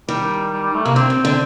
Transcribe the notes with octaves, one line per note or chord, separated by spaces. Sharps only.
D#3 G3
G3
G3
A3
C3 A#3
D3 C4
C3
D3